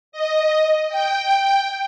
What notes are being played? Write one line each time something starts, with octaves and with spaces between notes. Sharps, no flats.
D#5
G5